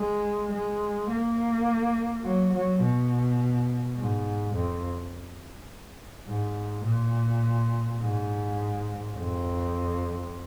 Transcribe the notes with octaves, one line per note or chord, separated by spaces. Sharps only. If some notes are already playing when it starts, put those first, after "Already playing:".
Already playing: G#3
G#3
A#3
F#3
F#3
B2
G#2
F2
G#2
A#2
G#2
F2